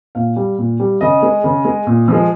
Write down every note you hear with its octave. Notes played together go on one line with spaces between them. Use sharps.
A#2 F5
G3
A#2
G3
C#3 D#5
G#3
C#3
G#3
A#2
F3 G#3